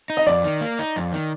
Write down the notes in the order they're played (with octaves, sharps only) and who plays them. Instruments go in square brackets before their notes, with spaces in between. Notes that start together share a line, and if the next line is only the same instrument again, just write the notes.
[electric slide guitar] D#4
[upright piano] D#5
[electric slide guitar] F2 [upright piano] D5
[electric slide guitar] D#3
A#3
D#4
F2
D#3